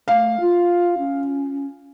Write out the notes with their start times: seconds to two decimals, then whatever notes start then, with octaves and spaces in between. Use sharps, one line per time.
0.08 A3 F5
0.40 F4
0.97 C#4